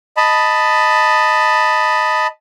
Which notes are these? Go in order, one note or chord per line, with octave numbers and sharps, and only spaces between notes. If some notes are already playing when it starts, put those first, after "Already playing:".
D#5 A5 B5